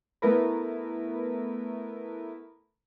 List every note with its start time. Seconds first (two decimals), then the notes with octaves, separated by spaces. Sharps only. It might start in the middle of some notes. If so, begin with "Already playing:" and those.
0.22 A3 B3 E4 A#4 B4